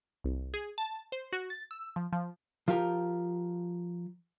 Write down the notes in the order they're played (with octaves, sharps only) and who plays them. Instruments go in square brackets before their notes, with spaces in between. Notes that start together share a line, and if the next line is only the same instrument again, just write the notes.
[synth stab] C2
G#4
A5
C5
F#4
A6
E6
F3
F3
[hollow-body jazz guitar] F3 F4 G4 A#4